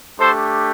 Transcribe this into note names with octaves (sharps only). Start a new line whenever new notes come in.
A3 D4 G4 A4 C5